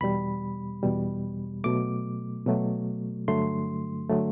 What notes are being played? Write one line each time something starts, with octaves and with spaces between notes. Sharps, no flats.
E2 B2 G3 B5
E2 B2 G3
B2 F#3 A3 D6
B2 F#3 A3
G2 D3 F#3 A3 C6
D3 F#3 A3